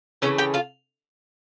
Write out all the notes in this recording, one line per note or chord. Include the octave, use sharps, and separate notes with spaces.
C#3 E3 A3 C#4 C#5
G4 G5
F4 F5